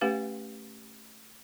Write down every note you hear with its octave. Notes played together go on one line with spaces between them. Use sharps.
A3 C#4 G4 B4 F5 F#5